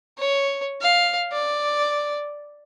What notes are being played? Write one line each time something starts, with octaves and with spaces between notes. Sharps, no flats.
C#5
F5
D5